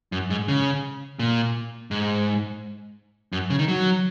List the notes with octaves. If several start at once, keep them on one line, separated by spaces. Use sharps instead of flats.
F#2
G#2
C#3
A#2
G#2
F#2
C#3
D#3
F#3